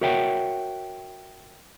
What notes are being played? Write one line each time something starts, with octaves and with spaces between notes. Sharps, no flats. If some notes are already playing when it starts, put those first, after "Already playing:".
F#4 A#4 C#5 E5 F#5 G5